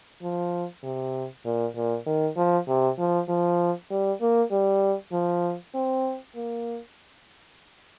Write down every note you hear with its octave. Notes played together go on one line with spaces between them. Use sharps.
F3
C3
A#2
A#2
D#3
F3
C3
F3
F3
G3
A#3
G3
F3
C4
A#3